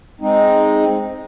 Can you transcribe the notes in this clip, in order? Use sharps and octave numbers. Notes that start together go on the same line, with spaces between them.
G#3 C4 D#4